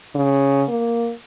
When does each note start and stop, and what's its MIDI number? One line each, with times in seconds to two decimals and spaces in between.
0.15 0.63 49
0.69 1.11 58